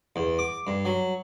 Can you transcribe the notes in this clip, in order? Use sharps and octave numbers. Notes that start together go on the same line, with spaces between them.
E2
D6
G2
F#3